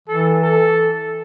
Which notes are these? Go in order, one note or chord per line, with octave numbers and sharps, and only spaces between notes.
E3 A4
A4